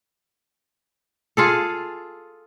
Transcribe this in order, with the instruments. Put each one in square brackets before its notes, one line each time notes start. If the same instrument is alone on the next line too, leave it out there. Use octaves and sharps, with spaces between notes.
[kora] F4 G#4 A4